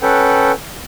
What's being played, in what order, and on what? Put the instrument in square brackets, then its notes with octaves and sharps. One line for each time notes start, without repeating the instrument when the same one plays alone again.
[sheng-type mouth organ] C#4 A4 B4 F#5 G5